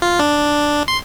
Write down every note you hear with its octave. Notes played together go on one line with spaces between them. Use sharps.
F4
D4
C6